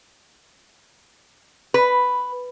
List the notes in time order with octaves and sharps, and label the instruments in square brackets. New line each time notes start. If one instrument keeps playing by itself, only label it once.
[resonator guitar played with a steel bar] B4